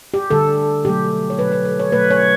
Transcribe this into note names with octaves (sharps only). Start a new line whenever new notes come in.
G4
D3 G3 A4
B2 F#3 A3 G4
C#5
B2 F#3 A3 B4
B4
A4
C#5
B2 F#3 A3 B4
C#5